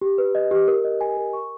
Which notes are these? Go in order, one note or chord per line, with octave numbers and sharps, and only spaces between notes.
G4
B4
D#5
G4
A#4
D#5
G#5
A#4
C#6